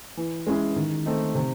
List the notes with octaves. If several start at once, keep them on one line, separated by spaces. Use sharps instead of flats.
E3
G#3 C#4 E4 G#4
D#3
A3 C4 D#4
C3